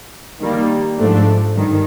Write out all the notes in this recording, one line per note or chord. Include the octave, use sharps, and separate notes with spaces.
D#3 G3 A#3
G#2 F3 A3 D4
G2 D#3